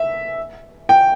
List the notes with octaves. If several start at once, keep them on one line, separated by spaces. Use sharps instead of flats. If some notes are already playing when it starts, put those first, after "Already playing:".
Already playing: E5
G5